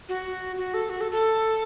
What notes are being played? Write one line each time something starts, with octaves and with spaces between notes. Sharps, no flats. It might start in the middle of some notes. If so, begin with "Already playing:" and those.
F#4
F#4
A4
F#4
A4
A4